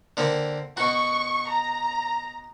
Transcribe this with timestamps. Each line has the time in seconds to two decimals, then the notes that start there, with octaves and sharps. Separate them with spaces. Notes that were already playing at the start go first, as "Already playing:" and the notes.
0.17 D3 A#3 C4
0.77 B2 F#4 C#6
1.48 A#5